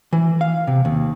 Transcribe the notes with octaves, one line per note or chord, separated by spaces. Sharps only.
E3
F5
C3
D#2